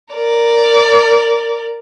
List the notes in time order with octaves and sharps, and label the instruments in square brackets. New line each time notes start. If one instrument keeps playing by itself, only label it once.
[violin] A#4 D5